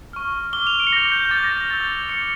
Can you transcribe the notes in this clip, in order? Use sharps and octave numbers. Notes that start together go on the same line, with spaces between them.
C#6 F6
D6 F6 G7
F7
D7
C#7
D6 G6 A#6
G6
G6
D6 F6 A6
A#6
G6
C#6 E6 G6 A6
D6 G6 C#7